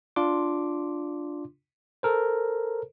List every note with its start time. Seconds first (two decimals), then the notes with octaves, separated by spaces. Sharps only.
0.16 D4 F4 C6 D6
2.03 A4 A#4 C5